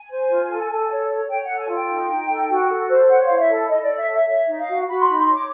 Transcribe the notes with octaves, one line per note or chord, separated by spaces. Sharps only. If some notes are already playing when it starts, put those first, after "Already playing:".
Already playing: G#5
C5
F4
A4
A4
C#5
C#5
C#5 G5
A4 F#5
G#5
F4
G5
D#4
D#4
A4
F#4
A4
C5
C#5 F#5
F5
E4
E5
A4
A4 D#5
D5
C#5
E5
C#5
E5
C#5 E5
D#4
F5
F#4
F#4 B5
C6
B5
D#4
C6
C#5
D6